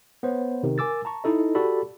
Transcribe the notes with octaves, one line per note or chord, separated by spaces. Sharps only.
B3 C5 C#5
C3 D#3
A#4 G#5 D6 E6 A6
A5 A#5 C#6
D#4 E4 A4 D#5
F#4 G4 A4 D5 B5